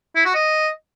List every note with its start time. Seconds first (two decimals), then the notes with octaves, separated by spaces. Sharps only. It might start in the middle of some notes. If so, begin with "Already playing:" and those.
0.15 E4
0.25 F#4
0.34 D#5